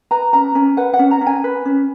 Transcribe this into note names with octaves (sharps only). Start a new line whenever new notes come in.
B4 A#5
C#4 A#5
C#4 G#5
B4 F#5
F#5
C#4
A#5
C#4
G#5
B4
C#4